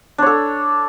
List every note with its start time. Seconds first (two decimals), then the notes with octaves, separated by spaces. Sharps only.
0.18 D4
0.22 C#5
0.26 A4